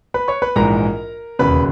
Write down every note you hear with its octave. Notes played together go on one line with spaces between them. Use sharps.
B4 B5
C#5 C#6
B4 B5
A#1 G#2 E3 G#3 A#4 A#5
E1 D#2 C#3 B4 B5